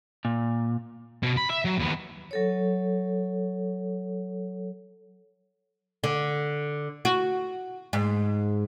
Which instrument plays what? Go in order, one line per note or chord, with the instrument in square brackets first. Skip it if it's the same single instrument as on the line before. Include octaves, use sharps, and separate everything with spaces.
[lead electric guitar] A#2
[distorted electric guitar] B2
B5
E5
F#3
D#2 B3
[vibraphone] F#3 A4 C#5
[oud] D3
F#4
G#2